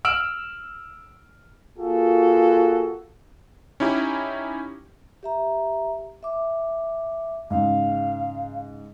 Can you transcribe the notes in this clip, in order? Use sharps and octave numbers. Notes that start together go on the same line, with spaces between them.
E6 F6 D7 F#7
A#3 F4 F#4 G#4 A4
C#4 D#4 E4 G4
G4 E5 A#5
E5 D6
G#2 C#3 F5